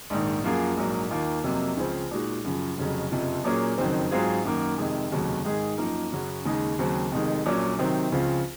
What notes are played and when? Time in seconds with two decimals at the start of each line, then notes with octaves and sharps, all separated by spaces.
0.10 A#1 G#2 D#3
0.44 F#2 F3 A#3 F4 G#4
0.77 A#1 G#2 F#3 A#3
1.11 D#2 D#3 A#3 F4
1.44 F2 C3 F#3 A#3
1.77 C#2 C#3 F3 C4
2.11 A#2 G#3 D#4 F#4
2.44 F#2 C#3 F3
2.78 F1 F2 C#3 F#3
3.11 F#1 F2 C3 F3
3.44 A#2 F#3 A#3 C#4 G#4
3.78 F#1 F2 D#3 F#3 C4
4.11 G#2 F#3 C4 F4 G#4
4.45 F#2 D#3 A#3
4.78 F2 C3 D#3 G#3
5.11 F1 D#2 C#3 F#3
5.45 G#2 D#3 G#3 D#4 G#4
5.78 F#2 F3 A#3 D#4 A#4
6.12 F#2 C#3 F#3
6.45 D#2 C#3 G#3 D#4
6.79 D#2 C#3 F#3 C4
7.12 F1 F2 D#3 G#3
7.45 A#1 A#2 F#3 C#4
7.78 C3 D#3 F#3 C4
8.12 C#2 C#3 F3 C4 F4